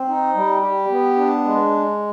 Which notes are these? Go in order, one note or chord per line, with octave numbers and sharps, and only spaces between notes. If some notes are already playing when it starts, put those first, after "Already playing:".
Already playing: C4
D#4
G3
G4
B3
D4
G#3